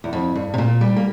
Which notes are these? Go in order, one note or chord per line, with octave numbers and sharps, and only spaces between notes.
E2
F2
G2
C3
A#2
G3
A#3